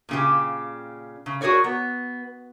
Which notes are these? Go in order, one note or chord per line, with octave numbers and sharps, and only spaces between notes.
A#2 C#3 G4
C#3
F#4 G#4 A#4 C#5 D5
B3